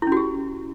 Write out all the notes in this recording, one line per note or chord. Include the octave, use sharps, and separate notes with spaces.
C#4 E4 F#4 G4